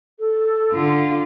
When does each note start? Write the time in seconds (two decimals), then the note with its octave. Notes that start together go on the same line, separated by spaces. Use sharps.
0.19 A4
0.72 D3 F4